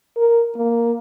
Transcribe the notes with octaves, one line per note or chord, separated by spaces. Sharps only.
A#4
A#3